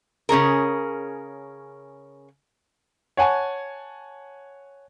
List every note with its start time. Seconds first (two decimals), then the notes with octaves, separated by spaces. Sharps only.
0.29 C#3 C#4 G#4 A#4
3.17 C#5 F#5 G#5 A5